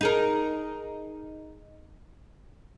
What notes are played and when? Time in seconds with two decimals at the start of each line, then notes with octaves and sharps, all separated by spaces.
0.01 D#4 G#4 A#4